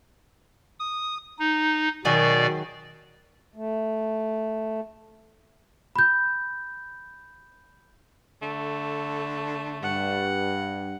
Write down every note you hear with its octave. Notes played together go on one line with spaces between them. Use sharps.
D#6
D#4
B2 D#3 F#3 G#4 D5
A3
B5 G6
D3 A3
G2 F#5